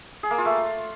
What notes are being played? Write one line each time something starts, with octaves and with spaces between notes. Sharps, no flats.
G#4
A#3
F4
A3